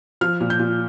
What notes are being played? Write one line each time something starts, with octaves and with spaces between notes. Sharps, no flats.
F3 F6
A#2
G6
A#2